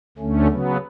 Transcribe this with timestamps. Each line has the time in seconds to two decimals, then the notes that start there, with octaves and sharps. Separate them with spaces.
0.18 D2 D3 A3 C#4
0.48 C#3 F#3 B3